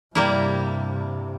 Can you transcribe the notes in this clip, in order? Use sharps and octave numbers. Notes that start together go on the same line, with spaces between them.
G2 C3 G3 A#3 E4